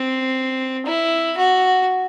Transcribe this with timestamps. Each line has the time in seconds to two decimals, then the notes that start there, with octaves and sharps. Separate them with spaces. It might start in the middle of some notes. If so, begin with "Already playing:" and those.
Already playing: C4
0.86 E4
1.37 F#4